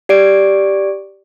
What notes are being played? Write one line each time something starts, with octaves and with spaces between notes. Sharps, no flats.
G4 D5 D7